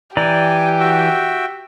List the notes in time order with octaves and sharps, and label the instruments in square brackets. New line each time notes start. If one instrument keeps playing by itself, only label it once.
[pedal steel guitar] E3 D5 A#5 [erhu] G4 [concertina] G5 G#5
[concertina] F#4 E5 G5